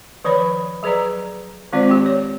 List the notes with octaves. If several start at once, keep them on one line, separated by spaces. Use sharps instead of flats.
D#3 F3 B4 C#5 B5
F#3 G#4 B4 D5 A#5
D#3 G#3 C4 F4 C5 D5
G4 G5
C#5